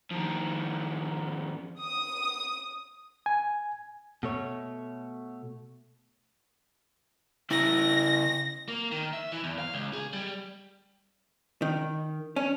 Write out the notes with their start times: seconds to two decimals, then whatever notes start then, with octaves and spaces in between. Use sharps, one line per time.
0.11 F2 D#3
1.80 D#6
3.26 G#5
4.23 B2 A3 C#5
7.50 C#3 E4 A#6
8.68 A#3
8.91 D#3
9.13 E5
9.32 E3
9.44 E2
9.59 F5
9.74 C#2
9.93 G#4
10.13 G3
11.62 D#3
12.36 C#4